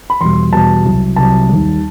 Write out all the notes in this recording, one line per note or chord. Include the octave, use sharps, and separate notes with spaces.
B5
E2 B2 G3 C6
E2 B2 G3 A5
C2 C3 F#3
C2 C3 F#3 A5
D#2 D#3 G3